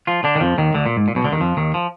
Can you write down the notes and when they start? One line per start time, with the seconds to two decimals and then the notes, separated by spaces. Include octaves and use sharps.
0.07 F3 F4
0.24 D3 D4
0.36 D#3
0.41 F2 F3
0.58 D#2 D#3
0.74 D2 D3
0.86 A#2
0.97 G#2
1.08 A#2
1.15 B1 B2
1.24 D2 D3
1.32 D#2 D#3
1.40 F2 F3
1.57 D#2 D#3
1.74 F3